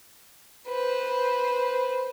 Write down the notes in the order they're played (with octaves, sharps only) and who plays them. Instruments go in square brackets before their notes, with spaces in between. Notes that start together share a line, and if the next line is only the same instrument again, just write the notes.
[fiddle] B4 C5